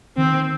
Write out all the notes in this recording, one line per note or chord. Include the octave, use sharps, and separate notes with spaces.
D#3 C4